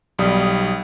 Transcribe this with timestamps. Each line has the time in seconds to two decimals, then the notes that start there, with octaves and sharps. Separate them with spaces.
0.19 B1 G3 D#6